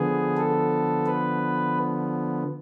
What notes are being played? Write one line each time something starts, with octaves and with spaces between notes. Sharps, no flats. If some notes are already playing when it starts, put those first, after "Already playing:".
Already playing: D3 F3 B3 G#4
A4
B4